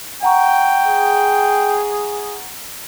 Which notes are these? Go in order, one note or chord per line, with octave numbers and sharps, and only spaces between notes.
F#5 G5 A#5 C#6
G#4